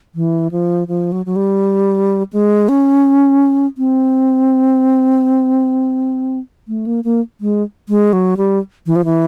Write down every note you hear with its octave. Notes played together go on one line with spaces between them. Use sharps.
E3
F3
F3
F#3
F#3
G3
G#3
C#4
C4
A3
A#3
A#3
G#3
G#3
F#3
G3
E3
F3
E3